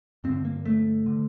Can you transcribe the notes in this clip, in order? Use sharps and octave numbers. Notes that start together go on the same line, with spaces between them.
G2 D3 C4
A#3
A3
D3